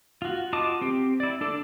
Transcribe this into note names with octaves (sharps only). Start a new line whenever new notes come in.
F4 F#4
F4 F#4 D#5 A5 D6
C4 G4
E4 D5
D4 A4 D5